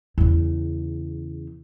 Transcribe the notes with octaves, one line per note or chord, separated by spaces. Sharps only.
E2 C#3